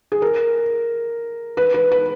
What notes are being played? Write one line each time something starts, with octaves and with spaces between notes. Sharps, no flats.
G#4
A#4
B4
B4
B4